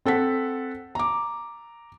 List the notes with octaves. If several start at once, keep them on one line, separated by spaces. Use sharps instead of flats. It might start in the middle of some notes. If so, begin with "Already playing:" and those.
C4 A4 F#5 B6
A#5 D6